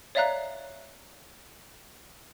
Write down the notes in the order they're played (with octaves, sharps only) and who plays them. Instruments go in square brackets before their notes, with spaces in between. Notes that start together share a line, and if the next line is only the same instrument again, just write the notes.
[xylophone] C#5 D5 E5 F5 A#5 F#6